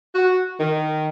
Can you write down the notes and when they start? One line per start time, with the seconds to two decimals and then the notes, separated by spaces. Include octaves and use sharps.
0.15 F#4
0.60 D#3